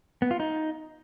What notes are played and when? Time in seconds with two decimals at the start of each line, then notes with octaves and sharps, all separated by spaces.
0.22 B3
0.31 F4
0.40 D#4